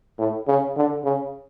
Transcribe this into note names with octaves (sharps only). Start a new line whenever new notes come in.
A2
C#3
D3
C#3